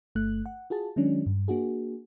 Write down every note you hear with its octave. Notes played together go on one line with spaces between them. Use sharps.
G1 A3 F#6
F#5
F4 F#4 G#4 A5
D#3 F#3 G#3 C#4 D4
G2
A#3 D4 F#4 G#4